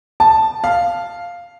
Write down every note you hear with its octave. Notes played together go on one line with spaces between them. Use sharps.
A5
F5